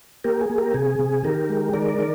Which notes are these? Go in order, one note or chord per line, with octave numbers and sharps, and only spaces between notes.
A#3 G4 A#4
G#4
A#3
G4 A#4
C3 G#4
C3
D#3 G4 A#4
G#3
D#3 A#4 D5
D#3